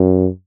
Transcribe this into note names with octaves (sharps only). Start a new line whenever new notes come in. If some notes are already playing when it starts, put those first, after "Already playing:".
Already playing: F#2